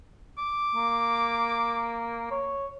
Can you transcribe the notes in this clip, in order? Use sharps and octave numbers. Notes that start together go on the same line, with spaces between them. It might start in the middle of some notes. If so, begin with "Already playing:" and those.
D6
A#3
C#5